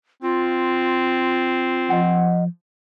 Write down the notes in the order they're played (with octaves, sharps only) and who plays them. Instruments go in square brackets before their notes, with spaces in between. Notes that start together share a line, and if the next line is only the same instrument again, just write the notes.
[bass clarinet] C4 [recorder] F4
[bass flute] F3 [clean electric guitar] D#5 F#5